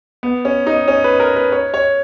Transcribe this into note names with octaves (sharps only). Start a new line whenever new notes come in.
B3
C#4
D#4
C#4
B4
A#4
B4
C#5
C#5